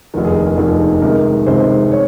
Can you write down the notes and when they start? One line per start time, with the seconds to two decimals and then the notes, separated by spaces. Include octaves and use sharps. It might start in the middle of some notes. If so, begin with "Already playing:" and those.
0.14 F1 D#2 D#3 A#4
0.25 G#4
0.35 A#4
0.46 G#4
0.57 F1 D#2 D#3 A#4
1.01 C#2 C3 D#3 A#4
1.47 C#2 C3 D#3 C5
1.91 C#5